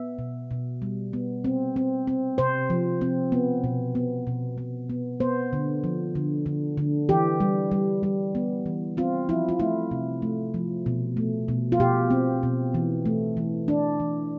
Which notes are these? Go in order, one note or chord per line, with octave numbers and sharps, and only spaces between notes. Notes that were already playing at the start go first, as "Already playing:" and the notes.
Already playing: B3 E5
B2
B2
G3
B3
C4
C4
C4
C3 C5
F3
C4
B3
B2
B3
B2
B3
B3
B3 C5
D3
F3
D3
D3
D3
E3 G4
G3
G3
G3
B3
E3
C4 F4
F3 E4
F4
A3 E4
C3
A3
F3
B2
A3
B2
F4
B2 G4
C4
B2
E3
A3
E3
E3 D4
E3